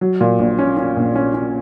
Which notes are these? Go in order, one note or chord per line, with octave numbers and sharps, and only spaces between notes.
F#3
A#2
A#1
C#4
C#4
A#1
C#4
C#4